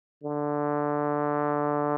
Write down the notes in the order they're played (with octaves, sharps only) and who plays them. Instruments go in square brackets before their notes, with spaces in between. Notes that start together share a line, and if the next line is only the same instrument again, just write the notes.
[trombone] D3